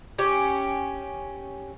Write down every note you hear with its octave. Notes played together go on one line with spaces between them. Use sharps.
C#4 G4